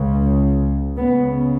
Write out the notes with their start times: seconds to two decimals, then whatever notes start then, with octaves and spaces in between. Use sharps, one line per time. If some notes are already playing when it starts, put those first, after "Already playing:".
Already playing: C#2 C#3
0.97 C#2 C#3 B3